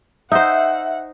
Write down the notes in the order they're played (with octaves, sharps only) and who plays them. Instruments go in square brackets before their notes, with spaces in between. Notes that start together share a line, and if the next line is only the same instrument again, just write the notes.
[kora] D#4 C5 [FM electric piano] E5 [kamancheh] F#5